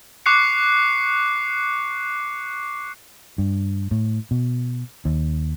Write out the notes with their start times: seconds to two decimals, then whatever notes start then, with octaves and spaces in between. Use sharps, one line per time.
0.26 C#6 D6 F#6 C7 C#7
3.38 G2
3.91 A2
4.31 B2
5.05 D#2